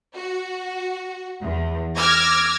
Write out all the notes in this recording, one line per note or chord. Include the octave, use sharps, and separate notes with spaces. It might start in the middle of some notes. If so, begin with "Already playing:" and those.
F#4
E2
D6 E6 F6 G#6 A#6